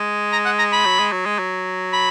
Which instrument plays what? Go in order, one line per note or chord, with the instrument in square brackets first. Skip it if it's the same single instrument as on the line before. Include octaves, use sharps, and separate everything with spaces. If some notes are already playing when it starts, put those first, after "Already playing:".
Already playing: [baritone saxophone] G#3
[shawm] A#5
F#5
A#5
B5
[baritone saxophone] F#3
G#3
F#3
G#3
F#3
[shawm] B5